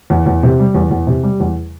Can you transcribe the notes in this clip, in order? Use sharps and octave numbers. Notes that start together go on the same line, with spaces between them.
E2
E2
C3
G3
E2
E2
C3
G3
E2